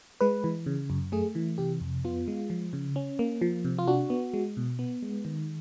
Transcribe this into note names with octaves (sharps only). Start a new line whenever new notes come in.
G#3 B4
E3
C#3
F#2
A3 G#4
E3
C3 G4
F2
B3 F4
G#3
F3
C#3
C#4
A#3
F3
C3
F4
D4 F#4
B3
G#3
B2
B3
G#3
D#3